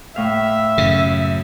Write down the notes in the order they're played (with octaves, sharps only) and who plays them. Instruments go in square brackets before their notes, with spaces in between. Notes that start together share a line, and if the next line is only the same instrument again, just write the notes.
[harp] A2 F5 [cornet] E5
[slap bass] F#2 C#3